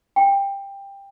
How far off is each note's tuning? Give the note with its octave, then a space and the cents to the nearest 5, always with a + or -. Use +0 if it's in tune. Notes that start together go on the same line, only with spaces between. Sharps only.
G5 +15